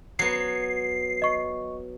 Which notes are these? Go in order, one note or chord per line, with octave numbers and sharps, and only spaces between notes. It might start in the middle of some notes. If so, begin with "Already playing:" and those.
F#3 B3 C7
D#5 C#6